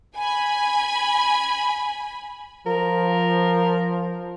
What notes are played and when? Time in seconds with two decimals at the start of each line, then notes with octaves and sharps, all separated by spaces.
0.16 G#5 B5
2.67 F3 A#4